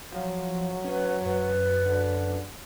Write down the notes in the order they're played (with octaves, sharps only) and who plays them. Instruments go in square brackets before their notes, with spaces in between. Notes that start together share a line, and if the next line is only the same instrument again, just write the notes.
[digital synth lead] F3 [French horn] F#3
[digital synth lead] C#4 [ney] B4
[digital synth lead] F#2 [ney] B4
[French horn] D3